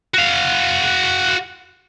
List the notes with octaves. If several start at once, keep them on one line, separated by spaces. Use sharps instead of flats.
F#4 F5